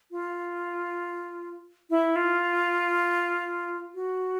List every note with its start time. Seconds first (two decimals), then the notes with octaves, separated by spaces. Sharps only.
0.11 F4
1.90 E4
2.16 F4
3.95 F#4